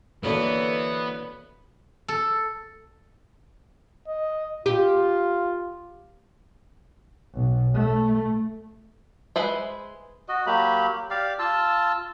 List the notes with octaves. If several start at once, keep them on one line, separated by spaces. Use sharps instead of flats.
D3 E3 F#3 A#3 B3
A4
D#5
F4 G4
B1
A3
G#3 B4 C5 E5
F#4 D#5
F#3 A#3 G4 B5
G4 D5 F5
F4 A5 E6